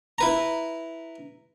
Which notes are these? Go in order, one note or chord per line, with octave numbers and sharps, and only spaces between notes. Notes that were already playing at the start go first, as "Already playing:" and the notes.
E4 B4 A#5